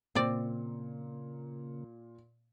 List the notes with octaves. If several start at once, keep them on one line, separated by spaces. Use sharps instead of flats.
A#2 C#3 A#3 C4 D5